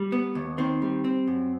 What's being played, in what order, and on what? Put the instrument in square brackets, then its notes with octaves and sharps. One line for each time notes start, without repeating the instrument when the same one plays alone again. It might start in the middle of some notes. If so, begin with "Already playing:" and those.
Already playing: [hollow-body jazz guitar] G3
B3
D#2
D#3 C4
G3
C4
F#2